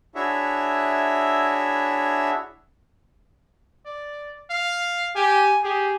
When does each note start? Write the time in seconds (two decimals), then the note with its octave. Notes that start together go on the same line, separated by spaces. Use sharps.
0.15 D4 E4 F#4 G#4 C#5 E5
3.86 D5
4.50 F5
5.16 G4 G#5
5.63 G4 G#4